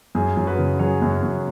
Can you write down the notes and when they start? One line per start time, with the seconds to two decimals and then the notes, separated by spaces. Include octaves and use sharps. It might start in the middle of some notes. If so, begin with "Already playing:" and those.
0.15 F#2 G#4
0.37 F#2
0.47 F#4 B4
0.59 C#3
0.79 F#3 G#4 C#5
1.02 F#2
1.23 F#2